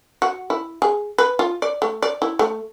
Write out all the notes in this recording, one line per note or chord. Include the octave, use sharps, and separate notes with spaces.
F#4
E4
G#4
B4
F4
D5
A3
D5
E4
A3